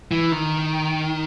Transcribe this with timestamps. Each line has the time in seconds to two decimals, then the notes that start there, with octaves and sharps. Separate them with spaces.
0.11 E3
0.32 D#3